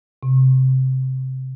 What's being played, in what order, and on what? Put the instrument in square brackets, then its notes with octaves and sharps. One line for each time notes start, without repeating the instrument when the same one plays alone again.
[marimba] C3